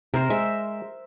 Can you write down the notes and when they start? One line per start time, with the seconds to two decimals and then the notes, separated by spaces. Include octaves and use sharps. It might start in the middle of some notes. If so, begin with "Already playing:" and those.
0.14 C3 A#4 C5
0.30 G#3 E5